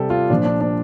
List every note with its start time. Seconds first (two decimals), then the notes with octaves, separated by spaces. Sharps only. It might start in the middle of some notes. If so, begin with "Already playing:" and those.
Already playing: C3 G3 G4 A4
0.10 F4
0.30 A#2 F3 D4
0.45 D4
0.61 D4